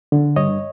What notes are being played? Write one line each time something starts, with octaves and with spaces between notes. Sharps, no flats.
D3
G2 C#5 D#5